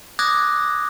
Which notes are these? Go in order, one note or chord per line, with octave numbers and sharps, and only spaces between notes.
D6 D#6 F#6 G#6 A#6